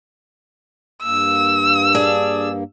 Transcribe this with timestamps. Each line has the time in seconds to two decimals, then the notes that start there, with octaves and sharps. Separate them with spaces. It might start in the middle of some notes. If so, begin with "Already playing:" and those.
1.03 G2 A#3 E6
1.95 D4 G#4